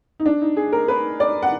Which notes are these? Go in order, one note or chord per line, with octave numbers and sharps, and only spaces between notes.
D#4
D4
D#4
G#4
A#4
B4
D5
F#5